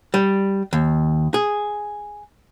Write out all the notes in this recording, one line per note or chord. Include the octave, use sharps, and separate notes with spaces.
G3
D#2
G#4